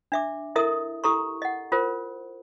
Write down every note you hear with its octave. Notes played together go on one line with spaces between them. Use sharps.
D4 E5 D6
E4 A4 A#4 D#5 E5 D#6
E4 G4 A4 A#5 C6 C#6
D#5 F#5
F4 A#4 C5